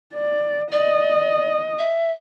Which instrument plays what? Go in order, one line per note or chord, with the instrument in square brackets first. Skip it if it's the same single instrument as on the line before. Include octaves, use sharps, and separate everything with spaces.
[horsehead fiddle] D5
[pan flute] D5 [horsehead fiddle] D#5
[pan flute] E5